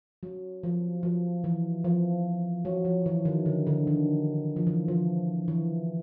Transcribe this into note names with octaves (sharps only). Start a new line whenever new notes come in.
F#3
F3
F3
E3
F3
F#3
F3
E3
D#3
D3
D3
D#3
F3
E3
F3
E3